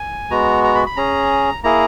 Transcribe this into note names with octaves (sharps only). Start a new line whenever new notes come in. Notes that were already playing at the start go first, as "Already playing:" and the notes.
Already playing: G#5
G#3 B3 F#4 A#5
A#5
B5
B5
C#4 G#4 A#5
A#3 E4 G#4 A#5